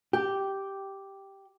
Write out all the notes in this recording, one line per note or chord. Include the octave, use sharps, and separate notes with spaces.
G4